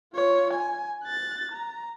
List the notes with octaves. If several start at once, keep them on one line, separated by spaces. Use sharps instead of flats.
F4 C#5
G#5
F#6 A6
A#5